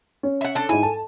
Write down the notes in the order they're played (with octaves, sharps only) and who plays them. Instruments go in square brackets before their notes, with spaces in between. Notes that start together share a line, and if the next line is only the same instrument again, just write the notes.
[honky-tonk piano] C#4
[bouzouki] E5 F#5
D4 A4
[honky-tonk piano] G#2 E4 [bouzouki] G#5
[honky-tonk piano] A4 A5